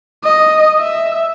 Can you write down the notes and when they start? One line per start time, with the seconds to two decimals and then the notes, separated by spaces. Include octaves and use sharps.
0.24 D#5
0.80 E5